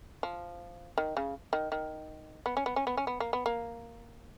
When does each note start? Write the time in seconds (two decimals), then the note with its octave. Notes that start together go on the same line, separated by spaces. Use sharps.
0.23 F3
0.98 D#3
1.17 C#3
1.53 D#3
1.72 D#3
2.46 B3
2.57 C#4
2.66 B3
2.76 C#4
2.87 B3
2.97 C#4
3.07 B3
3.20 A#3
3.33 B3
3.46 A#3